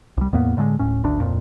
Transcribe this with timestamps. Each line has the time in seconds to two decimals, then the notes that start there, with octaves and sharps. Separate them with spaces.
0.17 C2 G3
0.33 E2 A2 A#3 B3
0.57 A2 D3 G3 G#3
0.79 D1 A2 C#4
1.03 G#1 D2 D4
1.20 D1 F2 A#2